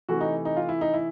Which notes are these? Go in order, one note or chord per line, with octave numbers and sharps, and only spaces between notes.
C3 E3 A3 F#4
D#4
D#4
F4
E4
D#4
E4